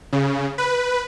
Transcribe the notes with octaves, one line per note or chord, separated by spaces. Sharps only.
C#3
B4